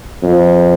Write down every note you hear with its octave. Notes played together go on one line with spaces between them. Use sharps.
F2